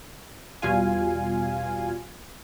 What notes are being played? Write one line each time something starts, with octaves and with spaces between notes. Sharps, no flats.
E2 B2 G3 F4 F5 G#5